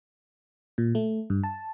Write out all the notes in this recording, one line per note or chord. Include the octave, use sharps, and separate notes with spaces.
A#2
A3
G2
A5